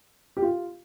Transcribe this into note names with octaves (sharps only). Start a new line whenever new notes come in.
G4
F4